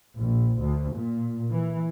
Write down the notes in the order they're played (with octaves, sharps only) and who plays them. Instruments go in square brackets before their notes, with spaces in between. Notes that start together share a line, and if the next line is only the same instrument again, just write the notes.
[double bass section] A#1
D2
A#2
E3